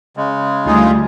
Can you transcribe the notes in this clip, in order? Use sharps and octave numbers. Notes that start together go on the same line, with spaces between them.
C#3 G#3
D2 G3 D#4 F4 G#4